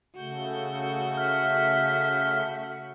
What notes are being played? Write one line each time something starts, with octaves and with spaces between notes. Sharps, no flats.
C#3 A3 F#4 G6
E5 F6